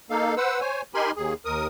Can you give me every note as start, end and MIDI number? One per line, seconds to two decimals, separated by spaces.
0.10 0.35 58
0.10 0.35 63
0.10 0.35 69
0.10 0.35 77
0.37 0.60 71
0.37 0.60 72
0.37 0.60 78
0.37 0.60 88
0.61 0.82 72
0.61 0.82 73
0.61 0.82 80
0.94 1.11 63
0.94 1.11 67
0.94 1.11 70
0.94 1.11 80
0.94 1.11 83
0.94 1.11 84
1.16 1.34 39
1.16 1.34 68
1.45 1.67 39
1.45 1.67 70
1.45 1.67 87